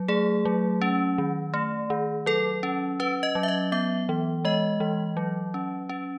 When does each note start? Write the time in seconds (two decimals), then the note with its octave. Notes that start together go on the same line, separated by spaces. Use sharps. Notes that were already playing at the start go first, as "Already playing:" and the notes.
Already playing: F#3
0.08 A3 G#4
0.45 F#3
0.82 C#4
1.18 D#3
1.54 A3
1.90 D#3
2.26 F#3 A4
2.63 C#4
3.00 C#4 B4
3.23 D#5
3.35 F#3
3.43 E5
3.48 D#5
3.72 B3 E5
4.09 E3
4.45 G#3 D#5
4.80 E3
5.17 F#3
5.54 C#4
5.89 C#4